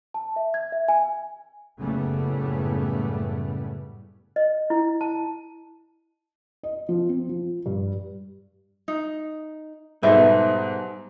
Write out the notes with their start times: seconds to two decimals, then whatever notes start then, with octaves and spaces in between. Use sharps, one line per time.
0.14 A5
0.36 E5
0.54 G#6
0.72 E5
0.88 G#5
1.78 F#1 A2 C#3 G3 A3 B3
4.36 D#5
4.70 E4
5.01 A5
6.63 D#5
6.89 F3
7.09 C4
7.29 F3
7.66 G2
8.88 D#4
10.03 G#2 B2 G3 D#4 A4 B4 C5 E5